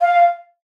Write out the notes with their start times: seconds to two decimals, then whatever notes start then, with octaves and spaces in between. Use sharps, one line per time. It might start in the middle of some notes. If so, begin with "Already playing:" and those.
0.01 F5